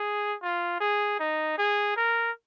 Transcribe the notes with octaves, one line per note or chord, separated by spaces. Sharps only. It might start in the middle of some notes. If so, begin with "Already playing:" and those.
Already playing: G#4
F4
G#4
D#4
G#4
A#4